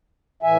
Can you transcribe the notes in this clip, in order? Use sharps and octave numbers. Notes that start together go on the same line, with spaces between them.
A2 E3 E5 G#5